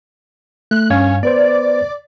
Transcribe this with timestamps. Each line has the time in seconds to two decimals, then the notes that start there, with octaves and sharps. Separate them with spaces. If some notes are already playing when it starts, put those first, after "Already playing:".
0.71 A3 F#6
0.90 G2 C#4 F5 G#6
1.23 B3 B4 C5 D5